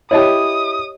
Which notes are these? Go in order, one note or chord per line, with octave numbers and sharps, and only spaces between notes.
E4 G4 C#5 D#5 A5 D#6